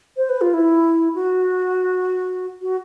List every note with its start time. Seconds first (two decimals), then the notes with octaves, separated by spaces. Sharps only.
0.17 C5
0.29 B4
0.41 F4
0.54 E4
1.15 F#4
2.62 F#4